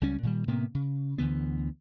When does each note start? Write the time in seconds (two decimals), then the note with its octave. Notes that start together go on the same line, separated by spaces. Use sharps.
0.01 C#2 G3 C#4
0.23 A#2 D#3 G3
0.47 A2 C3 A#3 B3
0.75 C#3
1.18 D2 D3 E3 B3